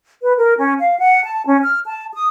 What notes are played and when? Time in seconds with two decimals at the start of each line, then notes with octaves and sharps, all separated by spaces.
0.23 B4
0.37 A#4
0.58 C#4
0.79 F5
0.99 F#5
1.24 A5
1.47 C#4
1.63 F6
1.86 A5
2.13 D#6